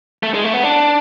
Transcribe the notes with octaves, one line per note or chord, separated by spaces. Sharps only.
A3
G#3
A3
B3
D4